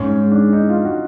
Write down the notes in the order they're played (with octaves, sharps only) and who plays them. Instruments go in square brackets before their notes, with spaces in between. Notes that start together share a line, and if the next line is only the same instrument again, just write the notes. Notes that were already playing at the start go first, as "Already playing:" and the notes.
Already playing: [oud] G#2 [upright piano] C#4
[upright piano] C#4
D4
D#4
F4
F#4